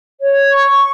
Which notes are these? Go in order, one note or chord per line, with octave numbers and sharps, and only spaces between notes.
C#5
C#6